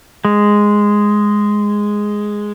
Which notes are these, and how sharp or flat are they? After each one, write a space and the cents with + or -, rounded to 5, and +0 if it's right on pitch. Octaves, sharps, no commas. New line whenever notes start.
G#3 -5